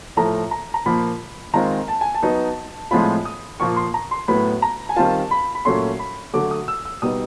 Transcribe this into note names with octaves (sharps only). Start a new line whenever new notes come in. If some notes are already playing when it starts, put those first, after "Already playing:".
A2 F3 A3 A#5
A#5
A#5
A#2 F3 A#3 B5
D#3 G#3 C4 F4 A#5
A5
G#5
A5
F#3 B3 D#4
A2 F3 G#3 C4 F4 B5
D#6
A#2 F3 A#3 C#6
C6
A#5
C6
A2 F#3 B3 B5
A#5
G#5
D#3 G3 C4 F4 A5
B5
B5
A#2 F#3 A3 C#4 C6
B5
D3 F#3 A3 D6
D#6
E6
E6
B2 G3 B3 D#4 D#6